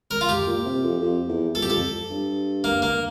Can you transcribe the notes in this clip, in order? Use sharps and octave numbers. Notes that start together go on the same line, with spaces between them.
A#4
F4
G4
A#2
C3
F2
F2
E2
F2 A4
G4
F2 A4
G2
A#3
A#3